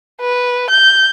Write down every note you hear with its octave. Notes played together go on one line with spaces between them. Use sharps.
B4
G6